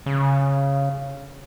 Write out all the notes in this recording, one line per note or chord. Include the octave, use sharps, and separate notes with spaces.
C#3